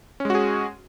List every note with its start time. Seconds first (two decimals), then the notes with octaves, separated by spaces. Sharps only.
0.20 C#4
0.25 G#3
0.30 F#4
0.35 G#4